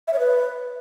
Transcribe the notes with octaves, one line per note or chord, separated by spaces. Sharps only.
E5
C#5
B4